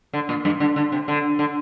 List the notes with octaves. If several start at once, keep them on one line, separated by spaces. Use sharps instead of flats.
D3
A#2
G2
D3
D3
C3
D3
D3